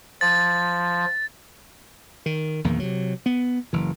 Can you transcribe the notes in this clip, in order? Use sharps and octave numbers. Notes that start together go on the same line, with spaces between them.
F3 A6
D#3
A#1 E2 D#3 A#3
C3 F#3
B3
F#1 E3